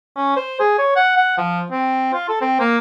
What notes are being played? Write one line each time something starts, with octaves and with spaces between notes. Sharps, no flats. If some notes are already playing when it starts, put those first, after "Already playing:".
C#4
C5
G#4
C#5
F#5
F#5
F3
C4
F4
A4
C4
A#3